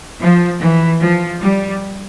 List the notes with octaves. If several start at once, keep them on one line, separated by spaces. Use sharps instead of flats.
F3
E3
F3
G3